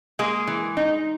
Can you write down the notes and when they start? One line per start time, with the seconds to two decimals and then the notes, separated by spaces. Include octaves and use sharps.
0.19 G#3 A#3 G#4
0.47 E3
0.77 D#4